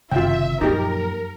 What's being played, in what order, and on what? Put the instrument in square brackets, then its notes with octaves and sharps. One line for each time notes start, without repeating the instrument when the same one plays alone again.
[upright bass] F#1 [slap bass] C3 D#3 [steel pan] F4 G5 [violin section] E5
[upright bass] F#2 [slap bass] A#2 F3 F#3 [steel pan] D#4 G4 [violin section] A#4